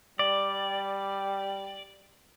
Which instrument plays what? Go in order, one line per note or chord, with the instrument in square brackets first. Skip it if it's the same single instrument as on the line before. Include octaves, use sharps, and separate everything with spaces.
[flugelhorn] G3 [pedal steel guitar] D5